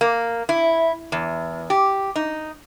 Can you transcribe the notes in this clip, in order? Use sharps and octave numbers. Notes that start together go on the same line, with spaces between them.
A#3
E4
E2
G4
D#4